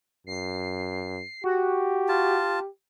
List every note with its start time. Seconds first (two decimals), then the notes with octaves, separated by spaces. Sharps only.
0.27 F#2 C7
1.44 F#4 G4
2.09 F4 A5